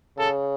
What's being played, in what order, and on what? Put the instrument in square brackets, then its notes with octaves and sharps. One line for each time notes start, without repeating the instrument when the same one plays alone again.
[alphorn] C#3 [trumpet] A4